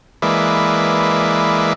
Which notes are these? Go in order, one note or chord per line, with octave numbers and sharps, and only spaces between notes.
E3 G#3 A#3 B4 D5 E5